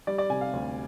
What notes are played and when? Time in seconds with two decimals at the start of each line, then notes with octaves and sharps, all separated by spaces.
0.07 G3 D5
0.18 D5
0.30 C3 G#5
0.41 F5
0.53 D2